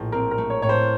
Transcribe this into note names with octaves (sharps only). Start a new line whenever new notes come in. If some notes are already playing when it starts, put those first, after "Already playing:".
Already playing: A#1 A2
C4 A#4
A#4
A3
C#5
A2 C#5
C5